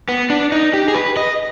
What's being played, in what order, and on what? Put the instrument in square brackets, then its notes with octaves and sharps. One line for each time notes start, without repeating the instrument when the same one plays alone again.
[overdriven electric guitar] B3
D4
D#4
G4
G#4
B4
D#5